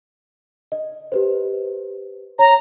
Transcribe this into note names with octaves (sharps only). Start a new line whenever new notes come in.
D#5
G4 B4 C5
C#5 A#5